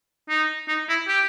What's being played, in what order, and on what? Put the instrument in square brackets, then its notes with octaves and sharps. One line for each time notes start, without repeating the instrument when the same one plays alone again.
[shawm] D#4
D#4
E4
G4